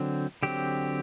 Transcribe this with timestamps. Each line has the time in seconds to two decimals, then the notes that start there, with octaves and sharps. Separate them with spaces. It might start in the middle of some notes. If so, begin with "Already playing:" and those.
Already playing: D3 F#3 C4
0.43 D3 F#3 C4 G4